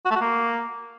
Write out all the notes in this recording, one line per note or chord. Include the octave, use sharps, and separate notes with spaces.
F#4
A3
F#4
A#3